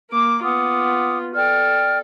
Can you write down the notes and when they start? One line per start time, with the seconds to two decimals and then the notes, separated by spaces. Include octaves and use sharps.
0.11 A#3 D6
0.43 B3 F4 F#5 D6 D#6
1.35 A4 D5 G5 F6